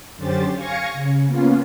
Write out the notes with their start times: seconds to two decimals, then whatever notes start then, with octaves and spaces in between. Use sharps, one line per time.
0.17 F#2 D3 C#4 G4 C5 A6
0.54 F5 G#5 C#6 G#6 A#6 C#7
0.93 C#3
1.26 A#3 B3 C#4 F4